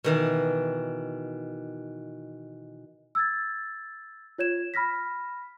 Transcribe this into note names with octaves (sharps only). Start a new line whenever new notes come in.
B2 D#3 E3
E6 G#6 A6
F4 C#5 G#6 E7
B5 F6 A#6 B6